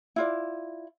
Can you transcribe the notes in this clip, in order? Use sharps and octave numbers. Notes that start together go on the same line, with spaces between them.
E4 F4 D5